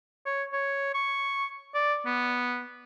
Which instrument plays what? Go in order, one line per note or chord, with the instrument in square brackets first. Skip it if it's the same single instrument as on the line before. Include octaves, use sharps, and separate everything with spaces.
[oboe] C#5
C#5
C#6
D5
B3